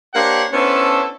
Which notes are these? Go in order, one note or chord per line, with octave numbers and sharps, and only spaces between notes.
A#3 D4 G4 C5 C#5 F#5
B3 C#4 D4 E4 A4 C5